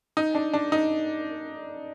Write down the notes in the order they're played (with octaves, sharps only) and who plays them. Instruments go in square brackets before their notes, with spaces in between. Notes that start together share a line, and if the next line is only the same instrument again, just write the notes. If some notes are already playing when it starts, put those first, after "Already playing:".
[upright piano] D#4
D4
D4
D#4